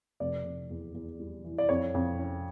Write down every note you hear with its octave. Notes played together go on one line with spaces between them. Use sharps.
F1 D5
F1
E2
E2
G3
E3
D5
F2 C#5
F2
C#4